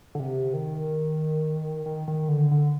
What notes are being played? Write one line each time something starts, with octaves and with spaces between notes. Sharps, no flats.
D3
C3
D#3
D#3
D#3
D3
D3